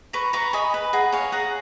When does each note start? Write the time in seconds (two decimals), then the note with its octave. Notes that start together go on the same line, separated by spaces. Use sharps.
0.13 B4 A#5 C#6
0.33 B4 A#5 C#6
0.53 D#5 G#5 B5
0.74 B4
0.93 G#4 F#5 A#5
1.12 C#5 F5 G#5
1.32 G#4 F#5 A#5